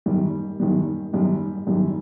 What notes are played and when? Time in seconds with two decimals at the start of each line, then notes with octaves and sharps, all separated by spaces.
0.06 F#2 D#3 G3
0.60 F#2 D#3 G3
1.13 F#2 D#3 G3
1.67 F#2 D#3 G3